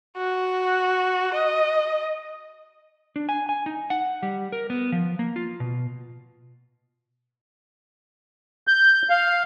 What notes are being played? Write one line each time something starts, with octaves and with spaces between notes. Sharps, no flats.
F#4
D#5
D4
G#5
G#5
D#4
F#5
G3
A#4
B3
F3
A#3
F4
B2
G6
F5